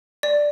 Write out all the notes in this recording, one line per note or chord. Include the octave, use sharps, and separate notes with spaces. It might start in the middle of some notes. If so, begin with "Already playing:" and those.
D5